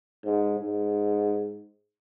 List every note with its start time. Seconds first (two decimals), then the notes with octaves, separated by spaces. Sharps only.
0.24 G#2
0.58 G#2